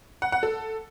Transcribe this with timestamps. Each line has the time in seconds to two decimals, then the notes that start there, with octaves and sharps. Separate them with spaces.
0.22 F#5
0.32 F#5
0.43 A4